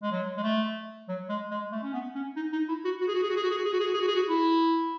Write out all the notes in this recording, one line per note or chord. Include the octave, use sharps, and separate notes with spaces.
G#3
F#3
G#3
A3
F#3
G#3
G#3
A3
C#4
B3
C#4
D#4
D#4
E4
F#4
F#4
G#4
F#4
G#4
F#4
G#4
F#4
G#4
F#4
G#4
F#4
G#4
F#4
G#4
F#4
G#4
F#4
E4